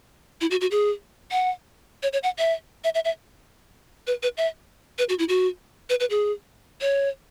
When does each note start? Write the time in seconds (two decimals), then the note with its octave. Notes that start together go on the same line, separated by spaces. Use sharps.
0.41 E4
0.51 F#4
0.61 F#4
0.71 G#4
1.31 F#5
2.03 C#5
2.13 C#5
2.23 F#5
2.39 E5
2.84 E5
2.95 E5
3.05 E5
4.07 B4
4.23 B4
4.37 E5
4.99 B4
5.09 F#4
5.19 E4
5.29 F#4
5.90 B4
6.00 B4
6.10 G#4
6.81 C#5